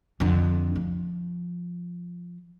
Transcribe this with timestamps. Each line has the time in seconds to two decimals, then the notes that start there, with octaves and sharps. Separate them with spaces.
0.20 F2 D3
0.76 F3